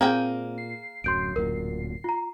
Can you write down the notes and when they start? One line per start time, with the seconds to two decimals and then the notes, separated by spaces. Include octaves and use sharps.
0.01 A#2 A#3 C4 G#4 G5
0.58 C7
1.04 D1 F#2 C6 G6 D7
1.36 D1 F#2 A#2 A#4
2.04 F4 A#5